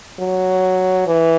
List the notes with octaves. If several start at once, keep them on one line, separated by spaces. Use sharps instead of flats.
F#3
E3